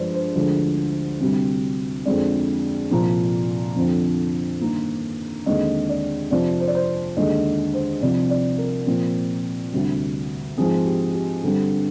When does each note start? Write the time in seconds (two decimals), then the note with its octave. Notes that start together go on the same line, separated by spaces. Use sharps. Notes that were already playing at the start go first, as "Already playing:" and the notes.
Already playing: G2 F3 G#3 C5 D5
0.14 C5
0.35 D2 D3 F3 G#3
1.21 D2 C3 G3 C4
2.05 F2 D3 G#3 C4 D5
2.91 C2 A#2 F3 A#3
3.76 F2 D3 F3 C4
4.61 G2 D#3 A#3
5.46 D#2 D3 G#3 C4 D#5
5.89 D5
6.31 F2 C3 F3 D5
6.60 C5
6.68 D5
6.75 C5
7.17 D#2 D3 G#3 D#5
7.74 C5
8.02 C2 C3 F3 C4 D5
8.30 D5
8.58 A#4
8.87 A#2 F3 C4
9.72 D2 C3 G3
10.58 G#2 F3 G#3 C4 G#4
10.85 G4
11.14 G4
11.42 G2 D3 G3 C4